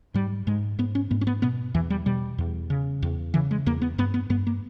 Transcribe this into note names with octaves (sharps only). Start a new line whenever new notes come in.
G#2 G3
G#2 G#3
G#2 B3
C#4
G#2 B3
C#4
B3
B2 B3
E2 E3
G3
B2 G3
E2
C#3
E2
C#3 E3
G#3
E2 A#3
B3
G2 B3
B3
G2 B3
A#3